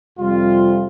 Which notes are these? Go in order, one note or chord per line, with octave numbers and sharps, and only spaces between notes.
F2 C3 G3 F4